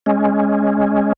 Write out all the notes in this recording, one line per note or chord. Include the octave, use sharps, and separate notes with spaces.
G#3 C#4